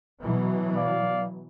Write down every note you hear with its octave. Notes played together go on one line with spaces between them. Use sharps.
B2 E3 F#3
D5 F5